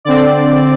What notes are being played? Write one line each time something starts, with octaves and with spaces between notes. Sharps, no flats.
D3 C4 D5